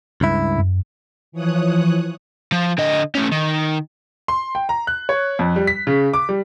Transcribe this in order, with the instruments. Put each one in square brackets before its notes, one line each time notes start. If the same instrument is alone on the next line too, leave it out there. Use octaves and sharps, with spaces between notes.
[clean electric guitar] C#2 G2 E4
[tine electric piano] F#2
[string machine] E3 F3 C#5 D#6 F#6
[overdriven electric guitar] F3
D3 D#5
A3 C#4
D#3
[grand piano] C6
G5
A#5
F#6
C#5
F2
G3
B6
C#3
D6
G3